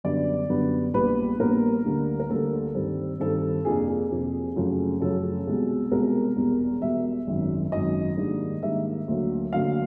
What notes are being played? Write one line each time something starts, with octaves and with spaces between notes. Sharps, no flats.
F#2 D3 G3 B3 D4 D5
F#2 D3 G3 B3 D4
A#1 A#2 G3 B3 D4 B4
A#1 A#2 G3 B3 D4 A#4
D2 D3 G3 A#3
A#4
D2 D3 G3 A#3 A4
G2 D#3 G3 C4
G2 D#3 G3 C4 A4
F2 C3 F3 A#3 D4 G#4
G#4
F2 C3 F3 A#3 D4
F#2 C#3 F3 A3 C#4
F#2 C#3 F3 A3 C#4 A4
C2 B2 G#3
C2 B2 G#3 A#4
E1 E2 B2 G3
E1 E2 B2 G3 E5
G#1 F#2 D#3 F#3
G#1 F#2 D#3 F#3 D#5
G#2 D#3 G3 A#3 D4
G#2 D#3 G3 A#3 D4 E5
D2 D3 F#3 A#3
D2 D3 F#3 A#3 F5